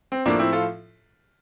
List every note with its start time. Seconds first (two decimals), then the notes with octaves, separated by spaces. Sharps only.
0.12 C4
0.26 A2 F3 A#3 D4
0.39 C4 E4
0.53 F4 A4